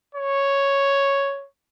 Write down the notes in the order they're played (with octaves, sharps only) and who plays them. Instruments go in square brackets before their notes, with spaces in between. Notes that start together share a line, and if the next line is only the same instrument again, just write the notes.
[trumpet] C#5